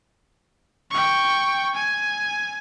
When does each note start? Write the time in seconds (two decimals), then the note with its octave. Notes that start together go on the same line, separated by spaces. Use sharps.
0.91 G5 C#6
1.75 G#5